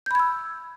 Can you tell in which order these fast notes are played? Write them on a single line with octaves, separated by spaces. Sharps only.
G6 B5 G#6 E6